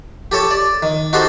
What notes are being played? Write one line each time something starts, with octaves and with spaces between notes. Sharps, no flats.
G4 A4 C#5 A5
D5
D#3
D#4 F#4 G4 A4 C5